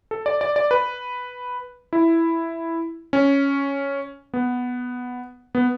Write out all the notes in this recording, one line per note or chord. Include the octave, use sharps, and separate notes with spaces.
A4
D5
D5
D5
B4
E4
C#4
B3
B3